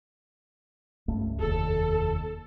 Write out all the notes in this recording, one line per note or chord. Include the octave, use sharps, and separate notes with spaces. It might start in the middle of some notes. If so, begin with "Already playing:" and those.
C#2 G2 A3
F1 D#2 A4